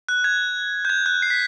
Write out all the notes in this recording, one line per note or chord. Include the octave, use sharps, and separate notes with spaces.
F#6
G#6
G6
G#6
F#6
C7
B6